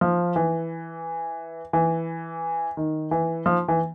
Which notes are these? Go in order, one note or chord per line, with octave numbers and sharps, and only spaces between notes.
F3
E3
E3
D#3
E3
F3
E3